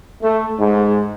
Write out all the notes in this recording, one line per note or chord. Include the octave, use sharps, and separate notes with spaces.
A3
G#2